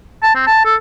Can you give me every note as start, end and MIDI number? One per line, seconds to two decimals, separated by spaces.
0.23 0.31 81
0.35 0.44 60
0.47 0.60 81
0.65 0.75 69